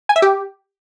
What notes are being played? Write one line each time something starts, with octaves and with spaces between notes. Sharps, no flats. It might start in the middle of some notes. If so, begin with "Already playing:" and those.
G#5
E5
G4